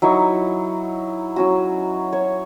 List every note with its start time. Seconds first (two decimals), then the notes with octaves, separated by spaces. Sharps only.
0.02 F#3 D#4 E4 C#6
1.36 F#3 C#4 F#4
2.13 C#5